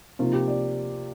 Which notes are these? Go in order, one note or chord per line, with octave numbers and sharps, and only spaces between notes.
C3 F3 A#3 D#4 F4
G4
D5